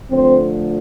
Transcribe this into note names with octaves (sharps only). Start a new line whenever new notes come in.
D3 F3 A3 C4 C5